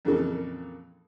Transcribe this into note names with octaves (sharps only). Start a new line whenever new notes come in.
F2 A#2 C#3 E3 A#3 A4